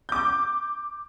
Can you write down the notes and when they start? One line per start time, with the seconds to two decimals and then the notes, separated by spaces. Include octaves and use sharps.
0.09 D6 G6